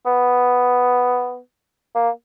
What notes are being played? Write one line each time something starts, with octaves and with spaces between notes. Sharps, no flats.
B3
A#3